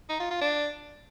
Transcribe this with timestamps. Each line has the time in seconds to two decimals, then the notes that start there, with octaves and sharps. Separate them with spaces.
0.09 D#4
0.20 F4
0.31 F4
0.41 D4